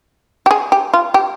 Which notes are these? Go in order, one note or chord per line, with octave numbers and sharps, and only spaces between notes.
G4
G#4
G4
F4
G4